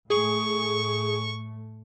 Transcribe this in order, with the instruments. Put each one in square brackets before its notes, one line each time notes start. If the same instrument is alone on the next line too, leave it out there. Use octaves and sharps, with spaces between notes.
[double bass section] A2 A3 [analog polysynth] G#4 [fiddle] C#6